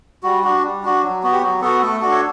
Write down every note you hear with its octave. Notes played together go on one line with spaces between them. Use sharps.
G3 F#4
D4 F#4
G3
D4 F#4
F#3
B3 F#4
G4
F#3 F#4
B3 F#4 A4
A3 A4
D4 F#4 A4
C#5